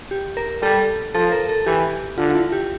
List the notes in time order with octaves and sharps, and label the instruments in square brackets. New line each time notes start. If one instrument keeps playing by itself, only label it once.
[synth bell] G4
A#4
[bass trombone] G3 [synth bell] A4
[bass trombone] F3 [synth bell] A4
[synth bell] A#4
A4
[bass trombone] E3 [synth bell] G4
[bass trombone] D3 [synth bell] F4
[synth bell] F4
E4
G4